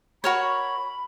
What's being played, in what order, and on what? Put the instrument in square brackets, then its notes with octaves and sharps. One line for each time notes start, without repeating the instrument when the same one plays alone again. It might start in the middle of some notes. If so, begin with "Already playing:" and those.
[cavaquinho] F#4 A#4 C#5 [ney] B5